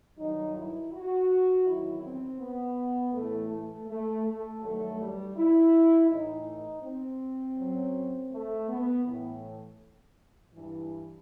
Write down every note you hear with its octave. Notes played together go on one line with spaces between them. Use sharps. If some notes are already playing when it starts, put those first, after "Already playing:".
G2 D#3 F#3 D#4
E4
F#4
E2 D#3 F#3 E4
C4
B3
A2 E3 A3
A3
A3
A3
G2 D#3 F#3 A3
G3
E4
A2 E3 D#4
C4
F#2 F#3
A3
B3
A2 E3
G2 E3